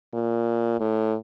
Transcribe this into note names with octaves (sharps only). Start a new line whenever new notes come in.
A#2
A2